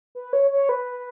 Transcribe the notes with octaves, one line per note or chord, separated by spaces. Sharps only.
B4
C#5
C#5
B4